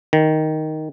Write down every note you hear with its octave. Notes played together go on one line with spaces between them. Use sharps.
D#3